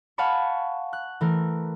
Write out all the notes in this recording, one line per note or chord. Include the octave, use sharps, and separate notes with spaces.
F5 F#5 G#5 A5 B5 C#6
F#6
E3 A3 A#4